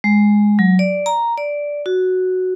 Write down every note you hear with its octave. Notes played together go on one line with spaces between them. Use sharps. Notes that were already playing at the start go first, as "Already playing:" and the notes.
G#3
F#3
D5
A#5
D5
F#4